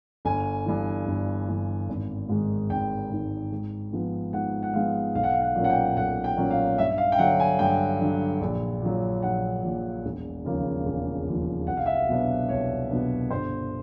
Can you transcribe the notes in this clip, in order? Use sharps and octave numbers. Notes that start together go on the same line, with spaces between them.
G1 G#5
G2 E3
G1
G2 E3
G#1
G#2 D#3 G#3
G#1 G5
G#2 D#3 G#3
G#2
F3 G#3 B3
G#2 F#5
F#5
F3 G#3 B3 F5
B1 F5
F#5
F5
F#5
A#2 F#3 A#3 C#4
F#5
G5
B1 F#5
G5
A#2 F#3 A#3 C#4
F5
G2 E5
F5
G5
D3 F#3 F#5
G#5
G2 G5
D3 F#3
A#1
A#2 F#3
A#1 F#5
A#2 F#3
E1
D#2 C#3 F3 A#3
E1
D#2 C#3 F3 A#3
C2 F#5
F5
E5
F5
B2 F#3 B3 D4
C2 C#5
B2 F#3 B3 D4
G1 C5